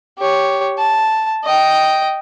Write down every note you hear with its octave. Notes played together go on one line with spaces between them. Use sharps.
G4 C#5
A5
D#5 G5